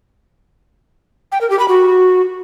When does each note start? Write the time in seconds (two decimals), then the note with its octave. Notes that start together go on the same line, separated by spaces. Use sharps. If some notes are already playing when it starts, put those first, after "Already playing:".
1.32 G5
1.41 A#4
1.50 G4
1.59 B5
1.68 F#4